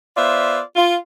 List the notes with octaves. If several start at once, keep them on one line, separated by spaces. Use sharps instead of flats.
B3 F4 C5 D5 E5
F4